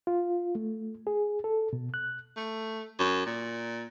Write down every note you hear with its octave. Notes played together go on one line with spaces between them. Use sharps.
F4
A3
G#4
A4
B2
F#6
A3
F#2
A#2